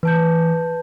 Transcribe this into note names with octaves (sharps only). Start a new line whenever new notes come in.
E3 B4 A5 G6